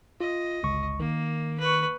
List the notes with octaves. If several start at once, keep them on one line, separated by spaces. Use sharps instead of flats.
F4 D#5
G1 C#2 C#6
D#3 A#3
B4 C#6